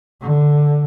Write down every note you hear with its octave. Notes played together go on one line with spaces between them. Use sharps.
D3